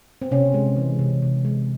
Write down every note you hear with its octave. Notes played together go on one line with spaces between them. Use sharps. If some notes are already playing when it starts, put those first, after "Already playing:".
C4
C3 C#4
G#3
E3
C3
C3
G#3